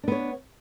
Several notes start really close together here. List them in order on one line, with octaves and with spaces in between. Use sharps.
D4 B3 C#5